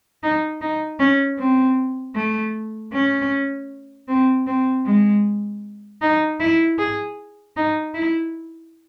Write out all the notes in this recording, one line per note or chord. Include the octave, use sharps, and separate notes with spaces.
D#4
D#4
C#4
C4
A3
C#4
C4
C4
G#3
D#4
E4
G#4
D#4
E4